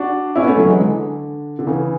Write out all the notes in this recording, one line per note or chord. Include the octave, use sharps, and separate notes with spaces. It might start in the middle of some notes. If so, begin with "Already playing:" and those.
Already playing: D4 F#4
C#4 E4
B3
A3 C#4
D3 F#3
E3 G#3
D3
D3
C#3 E3